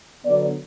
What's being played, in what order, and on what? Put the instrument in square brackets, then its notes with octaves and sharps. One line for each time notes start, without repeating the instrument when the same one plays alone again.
[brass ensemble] D3 F#3 B3 D5